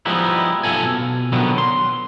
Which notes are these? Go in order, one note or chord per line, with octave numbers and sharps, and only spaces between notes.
F3 G3 G#3 B3 D#4 E4
B1 F4 A4 G#5
B2
B2 D3 D#3 F3 F#3 B3
C6